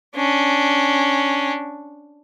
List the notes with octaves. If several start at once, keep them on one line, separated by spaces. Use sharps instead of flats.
C#4 D4